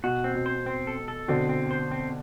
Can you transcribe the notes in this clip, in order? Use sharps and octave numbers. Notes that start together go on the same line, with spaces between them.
B2 F#4
C4
B2
C5
C4
A4
A4
B2 D3 C4
C4
C5
C4